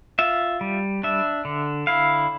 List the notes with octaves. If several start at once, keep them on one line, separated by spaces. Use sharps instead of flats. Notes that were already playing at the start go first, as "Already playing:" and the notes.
F4 E5
G3
D4 E5
D3
E4 F5